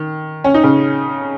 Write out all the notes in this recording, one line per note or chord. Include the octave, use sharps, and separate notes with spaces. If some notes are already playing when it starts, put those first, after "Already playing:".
Already playing: D#3
C#4
D#4
C#3 C#4